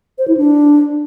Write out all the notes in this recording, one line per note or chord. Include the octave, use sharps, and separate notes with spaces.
C5
E4
D4